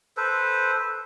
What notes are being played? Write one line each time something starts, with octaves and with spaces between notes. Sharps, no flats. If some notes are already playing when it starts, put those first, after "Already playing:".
A4 B4 C5